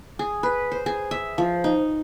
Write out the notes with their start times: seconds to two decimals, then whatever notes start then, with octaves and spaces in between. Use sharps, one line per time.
0.19 G#4
0.43 B4
0.72 C5
0.86 G#4
1.11 E5
1.38 F3
1.64 D#4